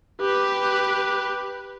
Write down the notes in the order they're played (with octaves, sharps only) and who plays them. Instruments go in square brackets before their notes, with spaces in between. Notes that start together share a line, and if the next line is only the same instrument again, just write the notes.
[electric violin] G4 B4